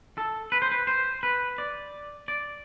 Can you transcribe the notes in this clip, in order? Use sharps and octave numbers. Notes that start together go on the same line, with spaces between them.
A4
B4
C5
B4
C5
B4
D5
D5